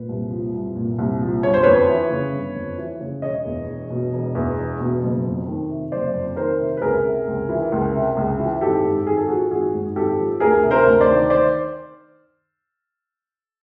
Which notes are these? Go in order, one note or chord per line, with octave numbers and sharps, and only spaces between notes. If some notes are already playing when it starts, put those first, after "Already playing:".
Already playing: A#2 B4
C2
F3
C2
A#2
C2
F3
G1 C#5
C5
F2 B4 C#5
E3
C#3
G1
F2
E3
C#3
E1 C#5 D#5
E2
E1
B2
E1
E2
E1
B2
F#1
F2
D#3
C3
F#1 C5 D5
F2
D#3 A#4 C5
C3
B4
C#2 G#4 A#4
C3
C#2
E3
C#2
C3
C#2
E3
G#1 G4 A4
G#2
G#1 G#4
A4
F3 F#4 G#4
G#1 F#4 G#4
G#2
G#1 G4 A4
F3
D2 G#4 A#4
C3
A#4 C5
D2
C5 D5
D#3
C5 D5